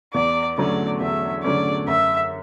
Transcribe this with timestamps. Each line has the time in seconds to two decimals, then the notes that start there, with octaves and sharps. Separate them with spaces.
0.14 E2 D5
0.58 D3 F#3 A3 C#4 D5
1.00 E2 E5
1.44 D3 F#3 A3 C#4 D5
1.87 F#2 E5